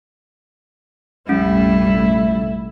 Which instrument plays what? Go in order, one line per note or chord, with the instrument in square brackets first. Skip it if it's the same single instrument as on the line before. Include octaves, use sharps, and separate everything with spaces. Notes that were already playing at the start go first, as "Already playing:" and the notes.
[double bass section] F1 A#1 A3 [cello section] G3 [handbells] C#4 [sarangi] E4